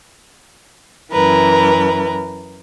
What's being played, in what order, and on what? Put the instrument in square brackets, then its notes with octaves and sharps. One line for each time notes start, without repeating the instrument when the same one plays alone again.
[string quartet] F#2 E3 A#4 B4